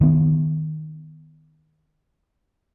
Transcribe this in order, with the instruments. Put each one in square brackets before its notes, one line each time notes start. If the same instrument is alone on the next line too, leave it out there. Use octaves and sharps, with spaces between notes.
[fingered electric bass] D#3 B3